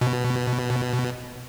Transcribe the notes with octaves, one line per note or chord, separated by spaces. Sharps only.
B2